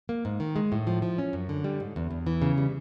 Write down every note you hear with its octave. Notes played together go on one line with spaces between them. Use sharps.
A#3
G#2
D#3
G#3
A2
F3
F3
C#4
F#2
D3
G3
G#2
E2
E2
E3
C#3
G3